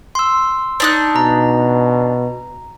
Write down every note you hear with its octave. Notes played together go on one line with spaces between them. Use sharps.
C6 E6
D4 D#4 F#6
B2 A#5